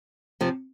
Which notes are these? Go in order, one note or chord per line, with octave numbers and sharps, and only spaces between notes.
C3 F3